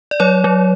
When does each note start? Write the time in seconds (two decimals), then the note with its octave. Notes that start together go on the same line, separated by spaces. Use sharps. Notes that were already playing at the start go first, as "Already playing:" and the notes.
0.11 D5
0.20 F#3 C#5
0.44 F#3